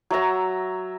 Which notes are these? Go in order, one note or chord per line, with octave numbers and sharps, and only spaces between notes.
F#3 E5 A#5